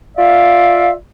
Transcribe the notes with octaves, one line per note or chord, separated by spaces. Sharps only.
F4 D5 E5 F5